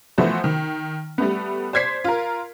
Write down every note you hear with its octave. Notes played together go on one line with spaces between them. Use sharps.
E3 F3 A3 B3 F#4 C5
D#3
G3 A3 B3
C5 D5 G#6 B6 C7
F4 A#4